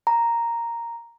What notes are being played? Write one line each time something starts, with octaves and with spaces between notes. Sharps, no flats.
A#5